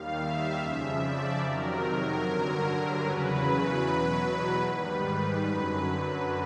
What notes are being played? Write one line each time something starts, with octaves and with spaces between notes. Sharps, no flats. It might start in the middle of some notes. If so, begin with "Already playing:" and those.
Already playing: D#2 D#3 G3 F5
E5
F2 C#3 F3 E5
D5
F2 C3 D#3 F#3 A#4
G2 D3 F#3
E2 C#3 F#3 B4
E2 B2 F#3
G#2 D#3 G3 B4
F#2 D3 F#3